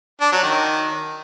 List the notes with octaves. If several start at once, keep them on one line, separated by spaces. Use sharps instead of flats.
D4
F#3
D#3